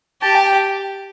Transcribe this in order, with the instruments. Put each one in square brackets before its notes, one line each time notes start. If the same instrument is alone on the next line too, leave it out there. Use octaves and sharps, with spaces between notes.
[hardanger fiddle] G4 [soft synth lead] A5
[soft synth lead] G5